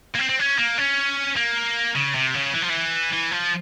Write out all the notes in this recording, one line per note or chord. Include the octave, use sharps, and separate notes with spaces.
A#3
C4
C4
C#4
A#3
C#4
A#3
C#3
C3
C#3
E3
F3
E3
E3
F3